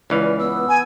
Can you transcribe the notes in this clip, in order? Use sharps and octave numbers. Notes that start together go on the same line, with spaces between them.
C#2 E3 D5 F5
B3 E6
G#5